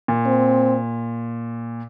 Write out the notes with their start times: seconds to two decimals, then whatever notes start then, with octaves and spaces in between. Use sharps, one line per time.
0.08 A#2
0.26 C4